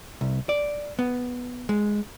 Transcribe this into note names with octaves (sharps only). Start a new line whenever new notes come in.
C2
D5
B3
G#3